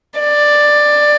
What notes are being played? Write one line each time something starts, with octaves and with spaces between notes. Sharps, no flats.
D5